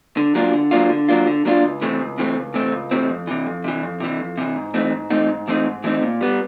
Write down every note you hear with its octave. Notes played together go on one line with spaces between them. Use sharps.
D3
F#3 A#3 D4 F4
D3
F#3 A#3 D4 F4
D3
F#3 A#3 D4 F4
D3
F#3 A#3 D4 F4
C#2
C3 E3 A3 C4
C#2
C3 E3 A3 C4
C#2
C3 E3 A3 C4
C#2
C3 E3 A3 C4
F2
C3 E3
F2
C3 E3
F2
C3 E3
F2
C3 E3
G#2
E3 A3 C4 D#4
G#2
E3 A3 C4 D#4
G#2
E3 A3 C4 D#4
G#2
E3 A3 C4 D#4
A#2
G3 B3